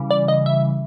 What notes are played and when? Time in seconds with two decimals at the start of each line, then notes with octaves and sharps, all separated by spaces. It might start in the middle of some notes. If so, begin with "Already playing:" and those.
Already playing: C#3 E3 G3
0.11 D5
0.28 D#5
0.46 E5